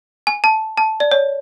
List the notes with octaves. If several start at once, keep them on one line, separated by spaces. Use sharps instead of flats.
G#5
A5
A5
D5
C#5